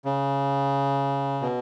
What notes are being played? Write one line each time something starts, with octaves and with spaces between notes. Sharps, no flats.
C#3
B2